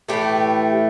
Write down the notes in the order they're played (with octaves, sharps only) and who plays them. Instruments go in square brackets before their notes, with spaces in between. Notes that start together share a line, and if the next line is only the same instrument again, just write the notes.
[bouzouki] A2 E3 A3 G4